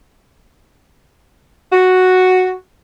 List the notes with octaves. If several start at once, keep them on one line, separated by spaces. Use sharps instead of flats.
F#4